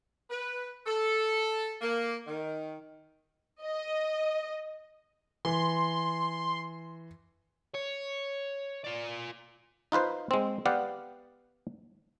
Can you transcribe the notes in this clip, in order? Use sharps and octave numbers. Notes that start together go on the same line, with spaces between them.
B4
A4
A#3
D#3
D#5
E3 C6
C#5
F4 D5
D#4 F4 B4 C5
G#3 C4
B3 G4 D5 F5 F#5